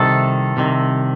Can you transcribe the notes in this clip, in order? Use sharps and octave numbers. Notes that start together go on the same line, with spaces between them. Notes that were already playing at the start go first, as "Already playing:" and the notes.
Already playing: C2 C3 D#3 A4
C2 C3 D#3